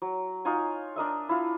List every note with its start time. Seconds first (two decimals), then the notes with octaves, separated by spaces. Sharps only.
0.02 F#3
0.45 D#4 F4 C#5 G#5
0.96 D4 A#4 D#5 E5
1.29 E4 F4